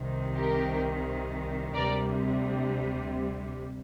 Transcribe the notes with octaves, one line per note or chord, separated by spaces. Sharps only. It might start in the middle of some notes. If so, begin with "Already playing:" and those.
Already playing: C2 C3 D#3
G4 A#4
D2 C3 G3 A#4 D5